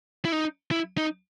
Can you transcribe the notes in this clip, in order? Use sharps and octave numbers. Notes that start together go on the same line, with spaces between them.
E4
D#4
E4
D#4